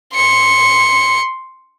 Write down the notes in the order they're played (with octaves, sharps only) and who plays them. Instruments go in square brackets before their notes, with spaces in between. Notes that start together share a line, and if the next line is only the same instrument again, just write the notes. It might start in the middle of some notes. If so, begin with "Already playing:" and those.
[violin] C6 C#7